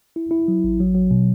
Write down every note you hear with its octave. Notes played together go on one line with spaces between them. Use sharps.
E4
E4
F#3
A1
F#3
F#3
B2